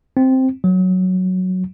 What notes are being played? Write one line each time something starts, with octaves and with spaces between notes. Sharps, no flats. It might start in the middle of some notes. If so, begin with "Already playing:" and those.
C4
F#3